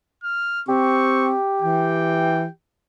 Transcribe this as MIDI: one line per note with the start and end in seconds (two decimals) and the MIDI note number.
0.24 0.62 89
0.69 1.35 60
0.69 2.49 67
0.69 1.31 85
1.62 2.45 52
1.62 2.51 79